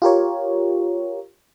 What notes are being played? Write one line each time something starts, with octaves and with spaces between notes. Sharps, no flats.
F4 G4 A#4 C#5